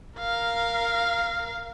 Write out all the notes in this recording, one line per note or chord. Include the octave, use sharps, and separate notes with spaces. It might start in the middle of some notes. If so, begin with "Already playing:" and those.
A#4 F5